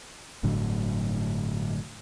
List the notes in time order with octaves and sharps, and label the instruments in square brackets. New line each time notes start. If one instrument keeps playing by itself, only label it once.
[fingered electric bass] G1 A2 D3 F#3